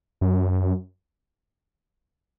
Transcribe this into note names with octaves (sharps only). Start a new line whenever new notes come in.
F#2